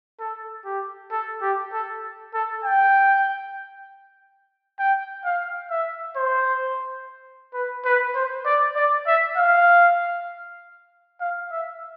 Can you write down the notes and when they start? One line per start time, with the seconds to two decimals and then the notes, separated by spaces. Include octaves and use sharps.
0.20 A4
0.65 G4
1.11 A4
1.42 G4
1.72 A4
2.34 A4
2.64 G5
4.79 G5
5.25 F5
5.70 E5
6.16 C5
7.54 B4
7.85 B4
8.15 C5
8.45 D5
8.76 D5
9.07 E5
9.37 F5
11.21 F5
11.51 E5